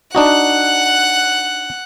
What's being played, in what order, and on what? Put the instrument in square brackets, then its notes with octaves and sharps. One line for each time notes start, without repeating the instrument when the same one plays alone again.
[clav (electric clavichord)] D4 D#4 F#4 [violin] F#5 F#6